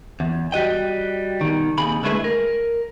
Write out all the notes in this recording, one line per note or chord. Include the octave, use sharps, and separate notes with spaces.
E2
G3 F#4 D#5 G5
B2 D#3
D#2 C3 G#4 B5
D3 G#3 A3 E4 G#4 B4
A#4